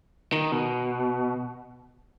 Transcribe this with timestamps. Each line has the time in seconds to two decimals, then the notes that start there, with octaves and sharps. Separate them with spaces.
0.33 D#3
0.52 B2